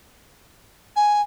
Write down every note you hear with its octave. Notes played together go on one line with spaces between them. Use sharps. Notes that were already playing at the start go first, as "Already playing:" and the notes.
G#5